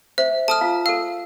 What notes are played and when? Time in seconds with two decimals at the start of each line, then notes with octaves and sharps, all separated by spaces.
0.18 C5 E5
0.48 A4 A5 D#6 F6
0.61 F4 F5
0.86 A4 F5 E6